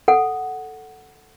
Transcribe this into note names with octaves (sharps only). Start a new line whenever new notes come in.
A4 F#5